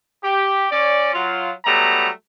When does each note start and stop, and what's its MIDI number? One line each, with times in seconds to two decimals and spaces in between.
0.24 0.66 67
0.71 1.11 61
0.71 1.11 74
1.13 1.50 54
1.13 1.50 65
1.66 2.08 54
1.66 2.08 55
1.66 2.08 57
1.66 2.08 59
1.66 2.08 82